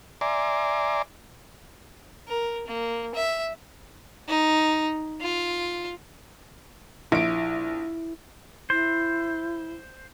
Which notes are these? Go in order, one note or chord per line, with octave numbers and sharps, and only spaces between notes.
D5 E5 G#5 A#5 C6 D6
A#4
A#3
E5
D#4
F4
A#1 E4 D7
E4 C5